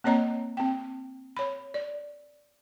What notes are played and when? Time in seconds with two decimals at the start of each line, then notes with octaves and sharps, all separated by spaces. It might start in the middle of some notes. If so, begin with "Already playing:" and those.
0.04 A#3 C4 C#5 D#5 A#5
0.57 C4 G5
1.37 C#5 B5
1.74 D5